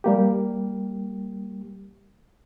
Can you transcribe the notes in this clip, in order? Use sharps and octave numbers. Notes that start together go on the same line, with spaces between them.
G3 A#3 G4